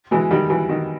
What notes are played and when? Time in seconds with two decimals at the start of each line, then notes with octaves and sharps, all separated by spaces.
0.11 E3 G#3
0.31 D#3 G3
0.50 E3
0.69 D#3